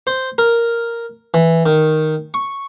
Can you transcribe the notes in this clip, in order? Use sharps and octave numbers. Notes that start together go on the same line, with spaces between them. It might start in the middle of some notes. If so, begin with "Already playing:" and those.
C5
A#4
E3
D#3
C#6